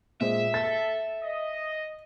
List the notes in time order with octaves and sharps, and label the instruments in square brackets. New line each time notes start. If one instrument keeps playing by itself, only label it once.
[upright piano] A#2 G#3 C5 [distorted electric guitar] E5
[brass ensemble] A4 [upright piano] A6
[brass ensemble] D#5